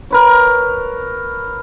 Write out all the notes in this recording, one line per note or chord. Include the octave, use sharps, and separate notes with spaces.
A#4 B4 C#5